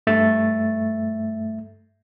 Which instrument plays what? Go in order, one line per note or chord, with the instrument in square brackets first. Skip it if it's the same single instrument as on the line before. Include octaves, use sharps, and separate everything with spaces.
[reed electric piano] G2 A3 E5 A6